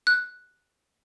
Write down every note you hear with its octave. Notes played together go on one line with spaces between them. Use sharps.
F#6